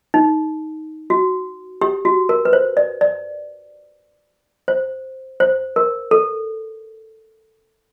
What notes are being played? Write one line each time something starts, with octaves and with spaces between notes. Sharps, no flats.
D#4
F#4
G4
F#4
A#4
B4
C5
D5
D5
C5
C5
A#4
A4